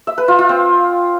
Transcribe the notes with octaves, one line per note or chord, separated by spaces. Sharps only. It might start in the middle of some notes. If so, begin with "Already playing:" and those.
E5
B4
F4
F4
C4